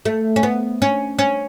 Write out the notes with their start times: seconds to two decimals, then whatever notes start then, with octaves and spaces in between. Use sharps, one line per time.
0.05 A3
0.36 C#4
0.43 B3
0.82 C#4
1.19 C#4